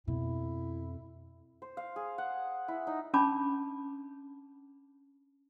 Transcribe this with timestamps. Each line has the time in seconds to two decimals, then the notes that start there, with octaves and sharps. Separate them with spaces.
0.08 F2 B2 E4
1.62 C5
1.77 F5
1.96 G#4
2.18 F#5
2.68 E4
2.87 D#4
3.14 C#4 D4 A5 B5 D6